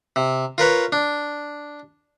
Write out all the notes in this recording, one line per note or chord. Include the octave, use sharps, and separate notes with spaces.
C3
F4 A#4 B4 C#5
D4